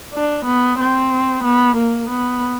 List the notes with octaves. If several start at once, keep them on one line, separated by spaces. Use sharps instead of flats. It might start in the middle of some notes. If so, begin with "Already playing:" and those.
D4
B3
C4
B3
A#3
B3